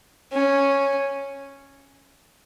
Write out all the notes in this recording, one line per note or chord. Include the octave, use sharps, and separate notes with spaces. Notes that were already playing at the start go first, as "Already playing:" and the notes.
C#4